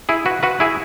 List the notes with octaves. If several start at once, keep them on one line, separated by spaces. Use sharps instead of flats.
E4 G#4
F#4 B4
F#4 B4
E4 G#4